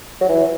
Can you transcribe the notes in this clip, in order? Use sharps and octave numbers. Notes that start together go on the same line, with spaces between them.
F#3
E3